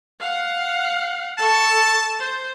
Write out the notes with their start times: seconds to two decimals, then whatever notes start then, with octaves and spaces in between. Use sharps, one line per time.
0.20 F5 F#5
1.38 A4 A5 C#6
2.19 C5